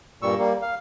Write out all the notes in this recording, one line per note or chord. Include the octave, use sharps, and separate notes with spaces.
G2 A#2 G3 C#6 E6
G3 A#3
F5